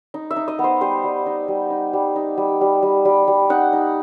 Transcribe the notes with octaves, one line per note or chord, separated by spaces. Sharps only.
D#4
E5
D#4
D#5
B3
C5
G3 C5
G3
D#4
G3
D#4
G3
D#4
G3
G3
G3
G3
G3
D#4 F#5
D#4